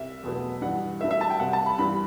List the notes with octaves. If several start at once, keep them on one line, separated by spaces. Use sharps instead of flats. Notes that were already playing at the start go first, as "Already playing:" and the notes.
Already playing: C2 E5
E2 B2 F#3 A3
G2 E3 G3 F#5
G2 F#3 A3 E5
E5
A5
G5
C2 C3 G3 F#5
A5
B5
G2 E3 G3 B5